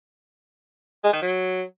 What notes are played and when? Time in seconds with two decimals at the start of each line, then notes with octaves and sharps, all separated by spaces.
1.04 G#3
1.13 D#3
1.22 F#3